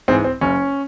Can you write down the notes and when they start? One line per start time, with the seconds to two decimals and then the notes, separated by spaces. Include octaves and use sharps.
0.08 G#2 E3 C4
0.24 C4
0.41 F#1 C#4